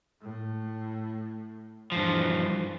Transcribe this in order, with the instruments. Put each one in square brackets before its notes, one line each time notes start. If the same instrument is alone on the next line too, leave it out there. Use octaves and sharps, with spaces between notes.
[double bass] A2
[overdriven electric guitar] G2 F3 [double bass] E3